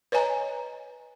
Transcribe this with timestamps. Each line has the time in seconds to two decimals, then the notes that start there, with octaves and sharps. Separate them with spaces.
0.12 B4 C#5 D#5 G#5 A#5